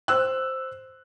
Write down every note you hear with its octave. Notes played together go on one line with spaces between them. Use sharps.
C5 E6 F#6